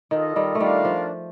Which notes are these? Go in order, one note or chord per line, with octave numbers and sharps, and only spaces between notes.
D#3 F4 A4 D#5
D#3 G3
A3
D#3 G3 D4 F4 A#4 D5 F5
F3